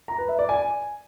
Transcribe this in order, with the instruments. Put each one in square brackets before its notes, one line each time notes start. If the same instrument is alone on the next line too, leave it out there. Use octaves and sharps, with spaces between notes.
[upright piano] A#5
B4
E5
D5
G#5